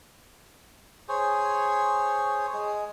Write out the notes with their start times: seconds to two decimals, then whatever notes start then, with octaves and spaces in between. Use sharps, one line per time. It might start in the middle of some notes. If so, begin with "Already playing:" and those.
1.09 G#4 C5 C#5
2.53 G#3 G#4